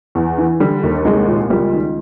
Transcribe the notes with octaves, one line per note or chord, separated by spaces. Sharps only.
E2
E3
D3 G3
D#2
C2 G#3
A#2
C#2 G3
D#3